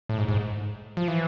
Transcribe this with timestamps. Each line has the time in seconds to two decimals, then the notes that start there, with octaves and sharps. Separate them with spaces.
0.09 A2
0.18 G#2
0.28 G#2
0.97 F3
1.08 E3